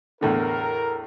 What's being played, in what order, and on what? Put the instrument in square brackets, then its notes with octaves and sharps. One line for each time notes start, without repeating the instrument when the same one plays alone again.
[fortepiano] E2 A2 D3 [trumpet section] A#4